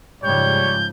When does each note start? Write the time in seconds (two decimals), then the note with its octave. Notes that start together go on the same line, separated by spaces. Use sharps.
0.23 G#2 C#3 F3 G3 C#5 G6